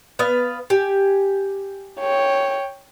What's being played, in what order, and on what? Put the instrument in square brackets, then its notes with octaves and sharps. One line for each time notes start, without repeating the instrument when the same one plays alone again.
[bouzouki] B3 B4 F5
G4 G#5
[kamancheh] C#5 G5